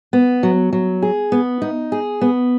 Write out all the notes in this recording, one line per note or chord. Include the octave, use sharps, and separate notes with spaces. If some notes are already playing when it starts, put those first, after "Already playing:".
B3
F#3
F#3
G#4
B3
D#4
G#4
B3